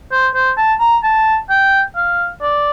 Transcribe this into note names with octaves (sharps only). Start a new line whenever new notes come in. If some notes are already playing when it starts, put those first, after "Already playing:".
C5
C5
A5
A#5
A5
G5
F5
D5